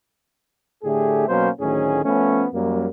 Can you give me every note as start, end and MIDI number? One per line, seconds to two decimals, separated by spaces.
0.84 1.26 45
0.84 1.26 50
0.84 1.26 57
0.84 1.26 67
0.84 1.26 68
1.29 1.49 47
1.29 1.49 54
1.29 1.49 58
1.29 1.49 61
1.29 1.49 72
1.61 2.01 38
1.61 2.01 45
1.61 2.01 51
1.61 2.01 54
1.61 2.01 61
1.61 2.01 68
2.05 2.46 53
2.05 2.46 57
2.05 2.46 59
2.05 2.46 61
2.53 2.88 42
2.53 2.88 55
2.53 2.88 58